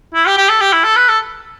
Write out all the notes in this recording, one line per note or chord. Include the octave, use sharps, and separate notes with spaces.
E4
G4
G4
A4
G4
E4
A4
B4
A4